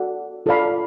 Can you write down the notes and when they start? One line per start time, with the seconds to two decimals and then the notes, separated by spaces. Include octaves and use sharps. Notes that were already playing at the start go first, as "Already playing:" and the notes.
Already playing: F#4 A4 D5 F#5
0.46 F4 A4 D5 F5 B5